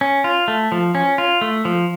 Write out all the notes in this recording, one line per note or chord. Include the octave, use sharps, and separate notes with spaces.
C#4
F4
A3
F3
C#4
F4
A3
F3